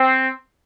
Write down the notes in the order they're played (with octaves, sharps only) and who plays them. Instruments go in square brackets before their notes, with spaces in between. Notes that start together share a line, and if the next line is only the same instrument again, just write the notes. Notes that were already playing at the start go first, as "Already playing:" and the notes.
Already playing: [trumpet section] C4